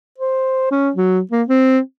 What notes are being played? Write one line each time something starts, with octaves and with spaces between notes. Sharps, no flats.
C5
C#4
F#3
A#3
C4